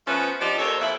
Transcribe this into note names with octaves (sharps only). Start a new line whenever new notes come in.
F3 A3 B3 C#4 B4
F3 D4 D#4 G4 D5
D#2 A4 C5 C#5
F2 A#2 E4 E5